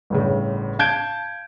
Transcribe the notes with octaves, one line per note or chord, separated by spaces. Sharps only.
G1 A2 C#3
F5 A5 G6 G#6 D7